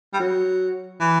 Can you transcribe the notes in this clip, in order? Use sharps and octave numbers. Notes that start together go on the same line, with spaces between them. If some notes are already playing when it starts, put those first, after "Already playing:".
G3
F#3
E3